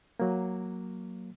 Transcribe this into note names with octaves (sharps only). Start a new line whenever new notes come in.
F#3 A#3